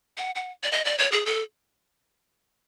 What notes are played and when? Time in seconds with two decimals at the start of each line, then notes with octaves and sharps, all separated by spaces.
0.17 F#5
0.35 F#5
0.63 D5
0.72 D#5
0.85 D5
0.98 C#5
1.12 G#4
1.26 A4